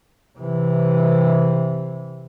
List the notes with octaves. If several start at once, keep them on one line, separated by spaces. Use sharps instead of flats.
C3 E3